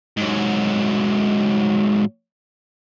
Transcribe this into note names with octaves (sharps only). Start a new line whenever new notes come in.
G#2 F#3